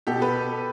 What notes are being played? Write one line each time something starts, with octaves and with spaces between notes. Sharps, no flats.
B2 G4 A4
A4 B4